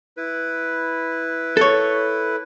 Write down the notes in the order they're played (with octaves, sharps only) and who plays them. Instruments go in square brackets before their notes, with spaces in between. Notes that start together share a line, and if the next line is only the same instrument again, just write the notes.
[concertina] E4 B4
[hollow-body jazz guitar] A4 C#5